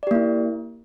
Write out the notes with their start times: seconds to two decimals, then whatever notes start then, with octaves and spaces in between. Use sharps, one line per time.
0.03 D5
0.07 G4
0.11 A#3
0.15 E4